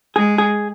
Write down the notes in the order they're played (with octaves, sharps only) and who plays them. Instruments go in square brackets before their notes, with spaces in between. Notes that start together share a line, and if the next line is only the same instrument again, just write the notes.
[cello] G#3 [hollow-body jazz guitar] G#4
[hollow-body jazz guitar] G#4